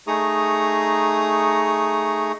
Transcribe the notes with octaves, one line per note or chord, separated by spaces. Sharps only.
A3 D#4 G#4 A#5 C#6 D#6